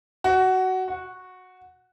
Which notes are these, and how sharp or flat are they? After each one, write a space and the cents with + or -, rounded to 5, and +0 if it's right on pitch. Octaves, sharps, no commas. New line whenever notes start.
F#4 +15
F#4 -10